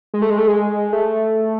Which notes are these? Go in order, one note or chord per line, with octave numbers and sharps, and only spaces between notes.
G#3
A3
G#3
A3
G#3
A3